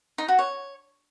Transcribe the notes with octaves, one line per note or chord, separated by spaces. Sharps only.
D#4
F#4
C#5